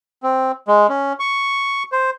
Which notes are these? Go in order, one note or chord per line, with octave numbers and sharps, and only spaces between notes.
C4
G#3
C#4
C#6
C5